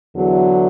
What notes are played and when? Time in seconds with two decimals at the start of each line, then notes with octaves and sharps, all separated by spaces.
0.16 E2 D3 F#3